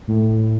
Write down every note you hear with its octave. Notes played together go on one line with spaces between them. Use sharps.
A2